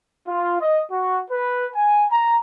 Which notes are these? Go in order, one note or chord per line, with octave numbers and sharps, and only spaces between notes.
F4
D#5
F#4
B4
G#5
A#5